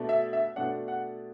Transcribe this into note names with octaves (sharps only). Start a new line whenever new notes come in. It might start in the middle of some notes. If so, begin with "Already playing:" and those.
Already playing: B2 A3 D4
E5
E5
B2 A3 D4 F#5
F#5